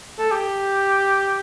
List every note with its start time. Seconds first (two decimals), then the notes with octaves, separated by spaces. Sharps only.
0.19 A4
0.32 G4